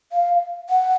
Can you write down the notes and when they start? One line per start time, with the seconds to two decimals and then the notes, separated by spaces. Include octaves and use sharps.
0.12 F5
0.69 F#5